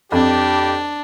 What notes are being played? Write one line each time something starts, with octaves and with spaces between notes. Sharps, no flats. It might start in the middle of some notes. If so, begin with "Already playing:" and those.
F2 D4 G4